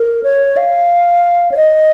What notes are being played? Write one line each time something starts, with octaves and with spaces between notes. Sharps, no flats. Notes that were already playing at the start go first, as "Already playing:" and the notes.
Already playing: A#4
C#5
F5
C#5
D#5